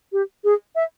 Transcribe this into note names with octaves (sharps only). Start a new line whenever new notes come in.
G4
G#4
E5